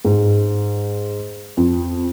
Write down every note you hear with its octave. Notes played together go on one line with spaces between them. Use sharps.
G#2
F2